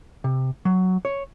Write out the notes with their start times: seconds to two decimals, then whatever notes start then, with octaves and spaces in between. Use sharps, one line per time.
0.24 C3
0.65 F#3
1.05 C#5